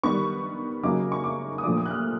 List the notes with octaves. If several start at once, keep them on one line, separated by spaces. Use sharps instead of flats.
D#3 G3 B3 C#6
C#3 F#3 A#3 D#4 D6
C#6
D6
D#6
A#2 F3 A3 D4 D6
D#6
F#6
F6